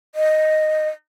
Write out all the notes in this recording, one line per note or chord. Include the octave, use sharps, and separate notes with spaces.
D#5